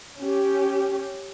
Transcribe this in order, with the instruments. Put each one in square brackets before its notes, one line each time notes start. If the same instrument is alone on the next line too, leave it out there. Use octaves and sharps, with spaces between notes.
[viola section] C#4 G4